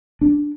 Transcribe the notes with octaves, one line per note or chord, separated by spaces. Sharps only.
D4